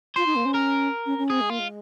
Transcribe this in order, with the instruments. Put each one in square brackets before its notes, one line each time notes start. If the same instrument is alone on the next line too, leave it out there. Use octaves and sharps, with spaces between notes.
[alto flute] F4 [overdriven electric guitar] C5
[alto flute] D#4
A#3
C#4
[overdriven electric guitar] A#4
[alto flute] C#4
C#4
[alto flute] C4 [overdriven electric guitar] G#4
[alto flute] G#3
[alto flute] A#3 [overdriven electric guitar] F4
[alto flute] G#3